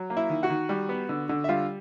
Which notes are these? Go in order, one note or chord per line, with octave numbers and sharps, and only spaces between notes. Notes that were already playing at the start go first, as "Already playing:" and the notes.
Already playing: F#3
A#3
E4 E5
D#3
F#4 F#5
D#3
G3
B3
D3
D3
E5
G3 F4 F5